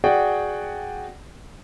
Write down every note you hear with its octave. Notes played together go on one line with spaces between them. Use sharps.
F#4 G#4 D5 F#5 G5